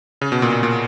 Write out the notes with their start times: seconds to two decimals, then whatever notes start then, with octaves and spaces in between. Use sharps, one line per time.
0.21 C#3
0.32 B2
0.42 A#2
0.52 A#2
0.63 A#2